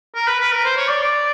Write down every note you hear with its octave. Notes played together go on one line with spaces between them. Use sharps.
A#4
B4
B4
A#4
C5
C#5
D5
D5